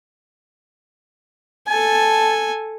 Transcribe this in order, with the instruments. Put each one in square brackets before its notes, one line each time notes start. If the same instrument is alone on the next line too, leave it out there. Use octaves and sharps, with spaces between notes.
[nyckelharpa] A4 G#5 [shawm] A5